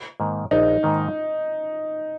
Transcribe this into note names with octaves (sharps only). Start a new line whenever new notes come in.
G#2 D#3 A#3
A#1 D#4
G#2 D#3 A#3